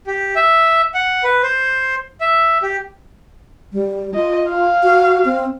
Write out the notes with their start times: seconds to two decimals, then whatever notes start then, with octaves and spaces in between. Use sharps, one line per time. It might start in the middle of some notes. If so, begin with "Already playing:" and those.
0.07 G4
0.36 E5
0.94 F#5
1.24 B4
1.43 C5
2.21 E5
2.63 G4
3.73 G3
4.15 F4 D#5
4.50 F5
4.83 F#4
5.25 C4